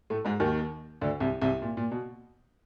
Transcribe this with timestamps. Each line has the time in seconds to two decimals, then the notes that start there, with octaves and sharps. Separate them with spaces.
0.10 A2 A3
0.25 G#2 G#3
0.40 D#2 D#3
1.01 D2 D3
1.20 C2 C3
1.42 C2 C3
1.62 A#2
1.77 A#2
1.91 B2